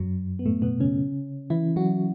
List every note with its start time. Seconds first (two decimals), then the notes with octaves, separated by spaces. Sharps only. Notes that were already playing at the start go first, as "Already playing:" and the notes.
Already playing: F#2 F#3
0.39 B3
0.46 A2 A3
0.62 B2 B3
0.80 C#3 C#4
1.50 E3 E4
1.76 F#3 F#4